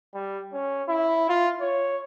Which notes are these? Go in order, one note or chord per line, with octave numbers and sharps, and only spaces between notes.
G3
C#4
E4
F4
C#5